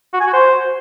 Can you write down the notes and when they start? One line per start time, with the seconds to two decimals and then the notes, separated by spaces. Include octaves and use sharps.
0.14 F#4
0.20 G#5
0.27 F#4
0.33 C5